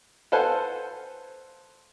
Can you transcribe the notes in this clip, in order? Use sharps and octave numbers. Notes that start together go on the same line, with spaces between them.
A4 B4 C5 F5 F#5 G#5